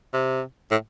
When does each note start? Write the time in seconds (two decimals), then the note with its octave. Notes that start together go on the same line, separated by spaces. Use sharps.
0.14 C3
0.71 A2